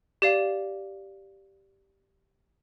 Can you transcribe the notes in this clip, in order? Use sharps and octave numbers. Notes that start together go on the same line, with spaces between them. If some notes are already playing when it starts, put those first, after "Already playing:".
G4 D5 F5